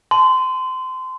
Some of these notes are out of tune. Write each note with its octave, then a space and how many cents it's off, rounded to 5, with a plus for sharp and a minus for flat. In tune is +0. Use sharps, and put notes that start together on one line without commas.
A5 -30 C6 -25